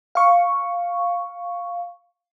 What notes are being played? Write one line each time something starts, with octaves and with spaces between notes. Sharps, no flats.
F5 C#6